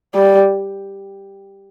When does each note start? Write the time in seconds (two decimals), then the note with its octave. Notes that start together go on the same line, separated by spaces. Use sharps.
0.15 G3